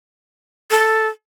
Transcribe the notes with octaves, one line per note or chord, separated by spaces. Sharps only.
A4